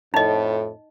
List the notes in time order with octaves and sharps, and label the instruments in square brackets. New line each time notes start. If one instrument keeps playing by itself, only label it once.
[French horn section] F2 A2 [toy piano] D#4 D#5